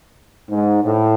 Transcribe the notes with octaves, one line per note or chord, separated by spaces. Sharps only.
G#2
A2